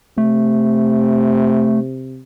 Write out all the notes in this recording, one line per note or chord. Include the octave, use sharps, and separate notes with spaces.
C3 A3